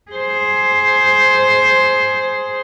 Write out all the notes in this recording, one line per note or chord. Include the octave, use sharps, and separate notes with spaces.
G#4 C5